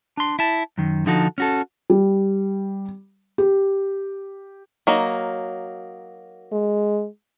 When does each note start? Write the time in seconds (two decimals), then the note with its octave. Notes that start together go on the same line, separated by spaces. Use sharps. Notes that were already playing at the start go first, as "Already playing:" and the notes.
0.17 D4 C6
0.39 E4 A5
0.78 F#2 D#3
1.06 D3 F3 D#4 F#4 A4
1.38 C#4 F#4 A4
1.90 G3
3.38 G4
4.87 F#3 A#3 D#4
6.52 G#3